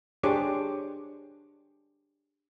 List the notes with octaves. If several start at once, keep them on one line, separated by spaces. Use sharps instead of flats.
D4 G4 G#4 C5 C#5 D6